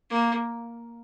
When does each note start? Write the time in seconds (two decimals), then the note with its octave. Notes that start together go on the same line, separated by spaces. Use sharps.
0.10 A#3